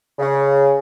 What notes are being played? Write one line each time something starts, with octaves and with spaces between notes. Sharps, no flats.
C#3